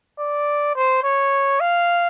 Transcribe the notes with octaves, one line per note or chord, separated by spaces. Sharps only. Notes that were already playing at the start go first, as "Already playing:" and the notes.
D5
C5
C#5
F5